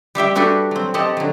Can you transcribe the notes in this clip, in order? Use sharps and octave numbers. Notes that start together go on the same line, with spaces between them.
G3 G4 E5 G5
G3 D4 F#4 G4 A4 B4
F#3 C4
C4 G4 D#5 F#5 A5
D3 F#3